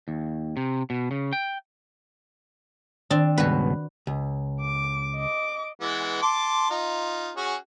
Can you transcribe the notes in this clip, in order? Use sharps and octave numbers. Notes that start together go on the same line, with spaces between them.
D#2
C3
B2
C#3
G5
D#3 C4 D4 D5
C#2 G2 B2 F#4 B4
C#2
D6
D#5 D6
E3 G#3 B3
A5 C6 D6
D#4 F4
C#4 F#4 G#4